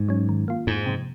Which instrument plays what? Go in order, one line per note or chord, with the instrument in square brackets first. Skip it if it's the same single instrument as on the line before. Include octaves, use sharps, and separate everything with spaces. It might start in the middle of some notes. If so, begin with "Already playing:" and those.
Already playing: [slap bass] G#2
[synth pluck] F#3 C#4
D#3
A#3 F4
[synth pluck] F2 [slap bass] G#2
[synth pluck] C3 F3